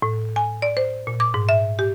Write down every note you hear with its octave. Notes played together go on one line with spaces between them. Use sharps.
A2
G#5
D5
C5
A#2
D6
G#2
E5
G4